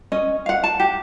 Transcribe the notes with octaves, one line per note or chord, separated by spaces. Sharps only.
C#4 D#5
F5 F#5
A5
G4